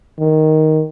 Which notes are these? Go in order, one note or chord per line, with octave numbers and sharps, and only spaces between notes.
D#3